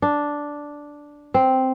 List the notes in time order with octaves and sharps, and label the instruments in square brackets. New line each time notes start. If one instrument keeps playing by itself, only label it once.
[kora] D4
C4